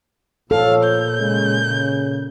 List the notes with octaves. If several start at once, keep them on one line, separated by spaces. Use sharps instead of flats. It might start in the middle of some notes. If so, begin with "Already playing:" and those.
A#2 F3 A4 C#5 F5
G6
C#3 G#3
C#3